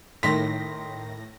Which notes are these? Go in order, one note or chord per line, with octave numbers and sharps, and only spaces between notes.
A2 D#3 C6 A#6 B6